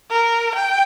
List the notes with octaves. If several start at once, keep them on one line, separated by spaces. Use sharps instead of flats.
A#4
G5